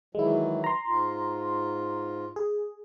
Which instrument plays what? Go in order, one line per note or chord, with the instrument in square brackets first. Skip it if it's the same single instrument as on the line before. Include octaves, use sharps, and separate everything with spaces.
[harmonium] D#3 E3 F#3 [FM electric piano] G#3 E4
[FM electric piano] A#5 C6
[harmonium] G#2 F4
[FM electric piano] G#4